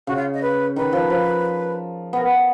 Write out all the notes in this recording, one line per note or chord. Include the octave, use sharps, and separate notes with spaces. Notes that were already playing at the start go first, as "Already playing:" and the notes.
C#3 F#4
F4
D#5
B4
D#3 B4
F3
F3
B3 A#4
B4